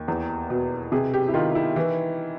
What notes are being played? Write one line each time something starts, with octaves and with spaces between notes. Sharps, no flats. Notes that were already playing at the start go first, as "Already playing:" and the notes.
Already playing: D#2
E2
B2
C3 G#4
G4
E4
D#3 F4
E4
E3